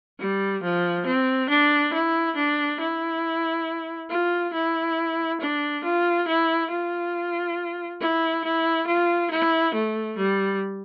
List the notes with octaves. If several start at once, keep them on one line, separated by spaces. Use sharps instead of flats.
G3
F3
C4
D4
E4
D4
E4
F4
E4
D4
F4
E4
F4
E4
E4
F4
E4
A3
G3